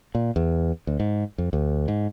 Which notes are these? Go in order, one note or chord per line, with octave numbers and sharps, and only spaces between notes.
A#2
E2
D2
G#2
F2
D2
G#2